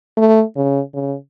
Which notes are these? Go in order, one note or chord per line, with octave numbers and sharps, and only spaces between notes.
A3
C#3
C#3